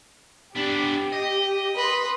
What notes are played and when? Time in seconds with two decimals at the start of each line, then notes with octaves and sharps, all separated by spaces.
0.55 B3 D4 G4
1.12 D#5
1.76 B4 C6 D#6